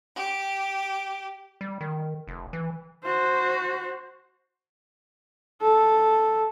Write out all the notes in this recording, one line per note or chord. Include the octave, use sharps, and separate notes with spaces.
G4
G3
D#3
F1
E3
F#4 C5
A4